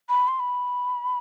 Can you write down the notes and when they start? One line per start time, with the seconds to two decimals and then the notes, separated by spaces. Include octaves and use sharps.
0.09 B5
0.28 C6
0.39 B5